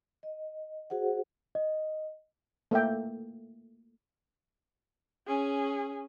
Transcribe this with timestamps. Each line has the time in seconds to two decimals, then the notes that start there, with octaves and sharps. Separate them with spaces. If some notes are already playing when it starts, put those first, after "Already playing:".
0.23 D#5
0.90 F#4 G#4 C5 F#5
1.55 D#5
2.71 A3 A#3 E5 G5
5.27 C#4 G#4